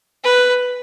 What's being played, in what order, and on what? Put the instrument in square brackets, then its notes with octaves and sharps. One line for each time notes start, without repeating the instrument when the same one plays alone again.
[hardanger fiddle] B4